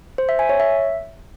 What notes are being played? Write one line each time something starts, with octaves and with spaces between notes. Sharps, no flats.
C5
E5
G#5
C#5
E5